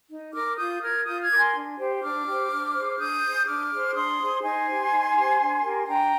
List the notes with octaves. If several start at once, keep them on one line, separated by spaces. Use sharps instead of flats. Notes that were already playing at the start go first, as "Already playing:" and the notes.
D#4
A#4 D6 F6
F4 D#6 G6
A#4 F6 G#6
F4 D#6 G6
F6 G#6
A#4 D6
G#5 C6
D4
G4 C5
D4 D6 F6
G4 C5
D4
G#4 C5
D4 D#6 G6
G#4 C5
D4 D6 F6
G#4 C5
D4 C6 D#6
G#4 C5
D#4 G#5 C6
G4 C5
D#4
G4 C5
D4
G4 A#4
D4 G5 A#5